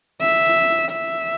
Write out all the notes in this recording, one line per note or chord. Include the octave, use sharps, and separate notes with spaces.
E5
E5